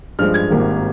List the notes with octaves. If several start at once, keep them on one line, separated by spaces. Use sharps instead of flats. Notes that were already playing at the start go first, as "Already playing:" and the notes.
G2 F3 G#3 F6
G#6
G#1 G#2 D#3 G3 A#3